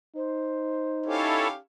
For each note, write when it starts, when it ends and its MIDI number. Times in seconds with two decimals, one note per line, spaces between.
0.16 1.55 63
0.16 1.15 72
1.06 1.56 61
1.06 1.48 64
1.06 1.56 67
1.06 1.48 69
1.06 1.48 73
1.06 1.56 77